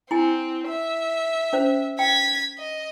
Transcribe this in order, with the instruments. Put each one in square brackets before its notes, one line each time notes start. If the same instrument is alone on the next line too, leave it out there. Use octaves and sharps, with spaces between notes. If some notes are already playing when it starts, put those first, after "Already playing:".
[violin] C4 [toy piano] E4 G#5
[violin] E5
[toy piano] C#4 C5
[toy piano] G5 [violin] G#6 B6
[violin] D#5